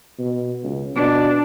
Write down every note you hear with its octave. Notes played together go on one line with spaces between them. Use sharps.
B2
C#2
B2 D4